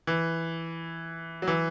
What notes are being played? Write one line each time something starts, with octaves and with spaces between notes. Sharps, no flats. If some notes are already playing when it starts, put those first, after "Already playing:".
E3
F#3
E3